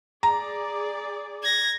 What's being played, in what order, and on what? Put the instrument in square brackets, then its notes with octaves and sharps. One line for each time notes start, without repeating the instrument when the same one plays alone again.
[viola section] G#4 D5 [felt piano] A#5
[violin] G#6 A#6